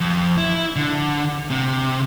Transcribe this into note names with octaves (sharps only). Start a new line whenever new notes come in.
F2
E4
D3
C3